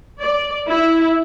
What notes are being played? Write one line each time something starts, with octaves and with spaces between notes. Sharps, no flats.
D5
E4